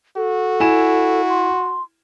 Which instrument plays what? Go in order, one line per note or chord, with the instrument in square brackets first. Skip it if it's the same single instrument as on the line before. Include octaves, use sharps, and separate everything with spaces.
[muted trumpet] F#4 [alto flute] A4
[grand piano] E4 G#5 E7
[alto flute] C6